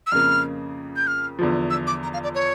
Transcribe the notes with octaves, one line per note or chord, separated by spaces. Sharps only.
E6
F2 C#3 F3 A#3 F6
G6
F6
E2 D3 F3
E6
D6
A#5
F5
D5
C#5